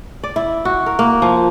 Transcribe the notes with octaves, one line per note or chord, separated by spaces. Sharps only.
D5
E4
F#4
A#4
A#3
F3